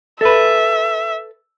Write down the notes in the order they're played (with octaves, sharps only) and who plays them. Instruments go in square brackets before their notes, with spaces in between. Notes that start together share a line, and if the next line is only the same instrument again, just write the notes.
[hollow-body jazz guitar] A4 B4 [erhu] E5